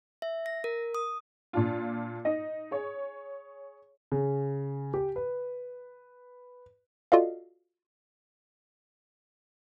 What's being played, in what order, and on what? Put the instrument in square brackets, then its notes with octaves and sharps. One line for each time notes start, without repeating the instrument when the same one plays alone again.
[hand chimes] E5
A#6
A#4
D#6
[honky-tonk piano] A#2 D4 F4
D#4 D#5
G#4 C#5
[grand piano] C#3
G4
B4
[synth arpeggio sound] F4 F#4 A4 D5 D#5 F5